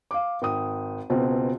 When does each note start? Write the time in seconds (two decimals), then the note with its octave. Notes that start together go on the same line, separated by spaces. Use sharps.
0.11 F5 D6
0.42 G#1 G5 D#6
1.10 C#2 B2 C4